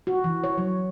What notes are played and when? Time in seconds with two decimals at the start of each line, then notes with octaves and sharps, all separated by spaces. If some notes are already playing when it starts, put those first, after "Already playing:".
0.07 F#4
0.24 E3
0.44 C#5
0.58 F#3